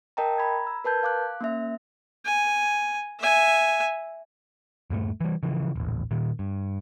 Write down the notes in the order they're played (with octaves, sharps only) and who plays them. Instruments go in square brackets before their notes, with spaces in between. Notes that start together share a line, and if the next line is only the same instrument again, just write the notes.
[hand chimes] A#4 D#5 G5 A5 A#5
A#5 B5 G#6
E6
A#4 B4 A5 G6 G#6
F5 D6 F#6
A#3 C#4 E5
[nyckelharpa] G#5
E5 G#5
[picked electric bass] D#1 G2 G#3 A3
E3 G3
C#3 E3 F3
D#1 A1
A#2 D#3
G2